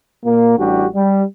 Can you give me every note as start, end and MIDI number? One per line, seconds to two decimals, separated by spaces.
0.25 0.58 46
0.25 0.58 58
0.58 0.86 33
0.58 0.86 55
0.58 0.86 62
0.58 0.86 66
0.58 0.86 67
0.94 1.23 55